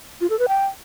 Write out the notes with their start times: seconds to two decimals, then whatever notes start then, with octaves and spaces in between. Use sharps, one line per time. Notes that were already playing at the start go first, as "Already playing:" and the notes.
0.21 F4
0.30 A4
0.39 B4
0.48 G5